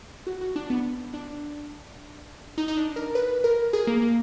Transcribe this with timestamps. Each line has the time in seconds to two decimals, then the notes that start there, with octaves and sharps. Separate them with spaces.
0.27 F#4
0.41 F#4
0.56 D4
0.70 B3
1.13 D4
2.58 D#4
2.68 D#4
2.77 D4
2.96 A#4
3.15 B4
3.44 A#4
3.73 G#4
3.87 A#3
4.02 A#3